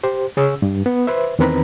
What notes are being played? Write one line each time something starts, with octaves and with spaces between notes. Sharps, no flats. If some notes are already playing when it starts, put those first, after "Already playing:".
G4 C5
C#3 C#4 G#4 E6
G2
B3
B4 C5 E5
E2 D#3 C4 B4 A#5 B5